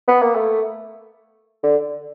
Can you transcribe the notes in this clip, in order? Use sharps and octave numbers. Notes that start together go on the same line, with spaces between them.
B3
A#3
A3
D3